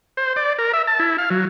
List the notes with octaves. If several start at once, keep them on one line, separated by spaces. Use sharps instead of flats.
C5
D5
A#4
E5
A5
E4
F5
F#3